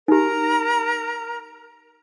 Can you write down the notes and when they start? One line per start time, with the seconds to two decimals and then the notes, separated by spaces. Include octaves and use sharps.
0.08 D#4 G4 A#4 A#5